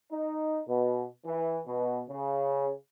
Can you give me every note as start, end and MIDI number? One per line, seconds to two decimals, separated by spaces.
0.11 0.60 63
0.67 1.06 47
1.26 1.59 52
1.66 2.02 47
2.09 2.70 49